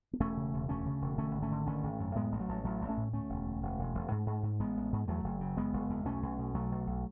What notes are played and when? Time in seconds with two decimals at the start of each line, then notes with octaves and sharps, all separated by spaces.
0.13 B3
0.20 E1 A3 C#4
0.37 C#3
0.54 E1
0.69 D2 A3 C#4
0.86 C#3
1.02 E1
1.18 D3 A3 C#4
1.35 G#1
1.42 A3 C#4
1.51 D3
1.66 G#1 A3 C#4
1.83 G#1
1.99 F#2
2.15 A2 G#3 B3
2.32 A1
2.39 F#3 A3
2.48 A1
2.64 A1 F#3 A3
2.81 A1
2.89 A3 C#4
2.97 A2
3.13 D2 A3 C#4
3.29 E1
3.46 D2
3.62 E1
3.79 E1
3.94 E1
4.11 G#2
4.26 G#2
4.43 G#2
4.60 A1 G#3 B3
4.76 A1
4.93 G#2
5.08 E2 F#3 A3
5.24 F#1
5.41 C#3
5.57 F#1 G#3 B3
5.73 F#1
5.90 E2
6.05 B1 A3 C#4
6.22 B1
6.39 B2
6.54 B1 F#3 A3
6.71 B1
6.87 B1